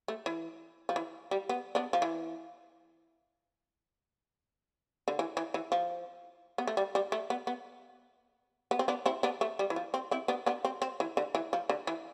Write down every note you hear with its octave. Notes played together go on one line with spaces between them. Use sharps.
A3
E3
F3
E3
G3
B3
B3 D4
F3
E3
D3
E3
E3
E3
F3
B3
A3
G3
G3
A3
B3
B3
B3
C4
B3 D4
C4 E4
B3 D4
A3
G3
E3
F3
C4
C4 E4
B3 D4
B3 D4
C4
C4
E3
D3
E3
F3
D3
E3